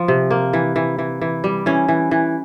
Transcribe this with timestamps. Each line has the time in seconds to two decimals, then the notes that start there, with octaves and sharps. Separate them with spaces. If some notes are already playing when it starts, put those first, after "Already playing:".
Already playing: F3
0.08 C3
0.31 A#3
0.53 E3
0.76 E3
0.99 E3
1.21 E3
1.44 G3
1.66 E3 C#4
1.88 E3
2.11 E3